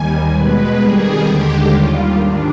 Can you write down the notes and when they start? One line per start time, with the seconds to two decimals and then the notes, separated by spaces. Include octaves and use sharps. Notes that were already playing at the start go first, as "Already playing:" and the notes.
Already playing: D#2 D#3 G3 G#5
0.32 B2 G#3 B4
0.78 F2 D#3 G3 G#4
1.24 D#2 D3 G#3 G4
1.69 D#2 D#3 G3 F4
2.15 G#2 D#3 G3 D4